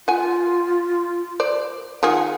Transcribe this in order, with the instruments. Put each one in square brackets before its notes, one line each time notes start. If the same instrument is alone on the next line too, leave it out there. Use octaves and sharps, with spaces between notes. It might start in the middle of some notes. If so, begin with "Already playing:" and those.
[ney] F4 [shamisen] F#5 G#5
[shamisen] C5 D5
[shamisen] D#3 F4 G#4 [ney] F#5